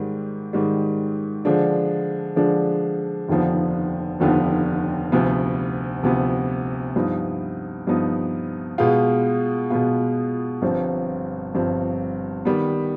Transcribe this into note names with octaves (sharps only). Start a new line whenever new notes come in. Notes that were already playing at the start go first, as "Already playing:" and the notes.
Already playing: G#2 D#3 G3
G#2 D#3 G3
D3 F3 G#3 D4
D3 F3 G#3 D4
F1 D#2 D3 F3 B3
F1 D#2 D3 F3 B3
D2 C3 F3 B3
D2 C3 F3 B3
G2 F3 B3 D#4
G2 F3 B3 D#4
B2 G#3 B3 F4
B2 G#3 B3 F4
G1 G2 F3 C4
G1 G2 F3 C4
D#3 G3 B3